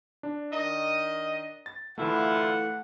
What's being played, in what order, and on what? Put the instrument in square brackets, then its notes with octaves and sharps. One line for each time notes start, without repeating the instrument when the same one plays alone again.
[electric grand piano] D4
[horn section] D#3 D#5
[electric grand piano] A6
[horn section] D3 E4 F4 [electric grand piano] E3 A3 [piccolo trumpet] F#5